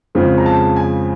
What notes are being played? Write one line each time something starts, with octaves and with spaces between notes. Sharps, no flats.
F2 C#3 F3 G#3
A#5
A5
G#5